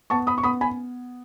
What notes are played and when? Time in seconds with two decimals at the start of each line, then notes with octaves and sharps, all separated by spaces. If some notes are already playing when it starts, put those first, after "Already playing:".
0.10 B3 A5 C#6
0.27 B5 D#6
0.38 C#6
0.43 B3 B5 D#6
0.61 G#5 B5